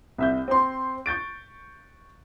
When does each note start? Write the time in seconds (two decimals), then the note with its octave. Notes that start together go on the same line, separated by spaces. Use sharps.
0.18 C2 E5 G6
0.48 C4 C5 C6
1.06 C#6 G6 A6 D7